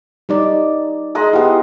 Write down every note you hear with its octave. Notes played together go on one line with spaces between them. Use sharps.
G3 D#4 D5
G#3 D#5 A#5
B3 E4 G4 F5